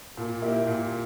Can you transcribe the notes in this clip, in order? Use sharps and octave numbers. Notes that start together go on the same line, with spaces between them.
A#2
A#3 E4 G4
A#2